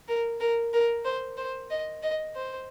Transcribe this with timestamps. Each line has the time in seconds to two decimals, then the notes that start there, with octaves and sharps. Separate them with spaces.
0.08 A#4
0.40 A#4
0.73 A#4
1.05 C5
1.37 C5
1.71 D#5
2.03 D#5
2.36 C5